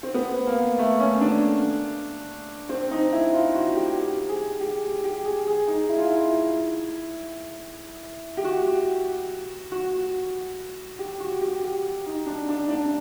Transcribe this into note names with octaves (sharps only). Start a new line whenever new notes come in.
C4
B3
A#3
A3
C#4
D4
C4
D#4
E4
F4
F#4
G4
G4
G#4
G4
G4
G#4
G#4
D#4
E4
F4
E4
G4
F#4
F#4
G4
F#4
G4
G4
D#4
D4
D4
D4